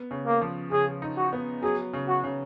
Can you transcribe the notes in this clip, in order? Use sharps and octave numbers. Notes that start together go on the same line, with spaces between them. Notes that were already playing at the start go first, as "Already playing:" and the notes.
Already playing: B3
C#3
A#3
F3
C#3 G#4
D#4
F#4
B3
F#3 G#4
C#3
F#4
C#3